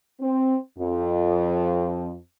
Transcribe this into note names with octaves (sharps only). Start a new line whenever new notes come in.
C4
F2